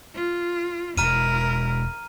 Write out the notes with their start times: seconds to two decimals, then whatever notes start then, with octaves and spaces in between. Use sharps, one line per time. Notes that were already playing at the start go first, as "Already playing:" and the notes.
0.15 F4
0.98 E1 E4 A#4 A#5 F6 D#7